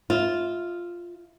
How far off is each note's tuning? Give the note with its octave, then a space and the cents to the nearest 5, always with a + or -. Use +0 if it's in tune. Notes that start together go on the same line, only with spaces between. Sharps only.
F4 +0 E5 -25